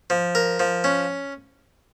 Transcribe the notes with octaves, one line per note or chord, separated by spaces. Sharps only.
F3
A#4
F3
C#4